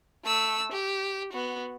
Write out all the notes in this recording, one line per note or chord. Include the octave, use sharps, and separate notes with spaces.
A3 E6
G4
B3 F#4